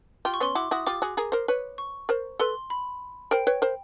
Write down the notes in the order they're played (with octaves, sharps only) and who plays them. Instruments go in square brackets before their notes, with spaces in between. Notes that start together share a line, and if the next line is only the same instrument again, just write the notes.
[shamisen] F4 G4 [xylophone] C6
[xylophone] C#6
[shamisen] B3 C#4 [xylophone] C6
[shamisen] E4 F#4 [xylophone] D6
[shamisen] E4 F#4 [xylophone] D#6
[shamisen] F4 G4 [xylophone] D6
[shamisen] F#4 G#4
G#4 A#4
A#4 C5
B4 C#5
[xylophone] C#6
[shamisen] A#4 C5
[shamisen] A4 B4 [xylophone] C6
[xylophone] B5
[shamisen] A#4 C5 [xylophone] G5
[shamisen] B4 C#5
A#4 C5